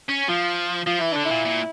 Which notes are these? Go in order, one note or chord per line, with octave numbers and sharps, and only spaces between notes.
C#4
F3 F4
F3 F4
E3 E4
D3 D4
E4
A#2
A#2